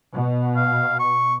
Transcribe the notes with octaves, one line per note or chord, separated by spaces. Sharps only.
B2
F5
C#6